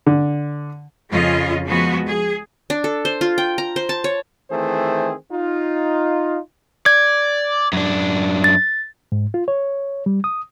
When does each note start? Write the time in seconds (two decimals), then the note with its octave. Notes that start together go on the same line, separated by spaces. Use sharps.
0.06 D3
1.10 F2 C#3 C#4 F4 D#5
1.65 F3 G#3 B3 F#4
2.06 G#4
2.70 D4
2.84 A4
3.05 C5
3.21 F4
3.38 G5
3.58 A#5
3.76 C5
3.89 A5
4.04 C#5
4.51 D#3 E3 A3 C4 G#4 C5
5.32 D#4 F4
6.86 D5 G#6
7.73 F#2 D4
8.44 A6
9.12 G#2
9.34 F4
9.48 C#5
10.06 G3
10.24 D#6